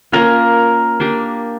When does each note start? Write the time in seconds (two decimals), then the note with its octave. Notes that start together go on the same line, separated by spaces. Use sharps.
0.12 A#3 C#4 F4 A#4
1.00 A#3 D4 G4